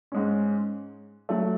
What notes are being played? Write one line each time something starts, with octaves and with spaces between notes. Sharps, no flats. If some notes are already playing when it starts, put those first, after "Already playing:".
G#2 G#3 C#4
F#3 A3